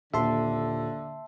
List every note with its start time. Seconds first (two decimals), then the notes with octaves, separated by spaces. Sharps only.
0.14 D#1 D3 E5 A5 C6